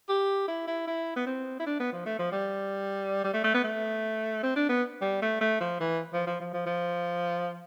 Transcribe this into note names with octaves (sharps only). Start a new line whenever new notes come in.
G4
E4
E4
E4
B3
C4
E4
D4
B3
F3
A3
F3
G3
G3
A3
A3
B3
A3
C4
D4
B3
G3
A3
A3
F3
E3
F3
F3
F3
F3
F3